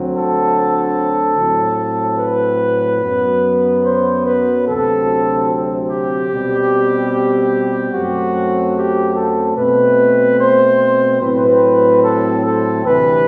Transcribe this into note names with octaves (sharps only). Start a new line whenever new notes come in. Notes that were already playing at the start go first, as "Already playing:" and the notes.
Already playing: D2 D3 F#3 C4
A4
A2 F#3 C4
B4
F#2 F#3 B3
C5
B4
D2 C3 F#3 C4 A4
G4
B2 G3 C4
F#2 F#3 A3 C4 F#4
G4
A4
B2 A3 C4 B4
C5
A2 F#3 C4 B4
A4
A4
D2 C3 E3 G3 B4